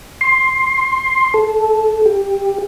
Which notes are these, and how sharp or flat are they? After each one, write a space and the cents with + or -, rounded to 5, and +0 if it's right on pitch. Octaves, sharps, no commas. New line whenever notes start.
C6 +15
A4 -15
G4 +15